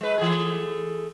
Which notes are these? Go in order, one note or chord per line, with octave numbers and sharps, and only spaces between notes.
G#3 B4
E3 A3 G#4